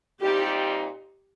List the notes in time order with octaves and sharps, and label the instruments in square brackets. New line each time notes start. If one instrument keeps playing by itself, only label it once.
[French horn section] A#2 G3 C4 D#4 [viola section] G4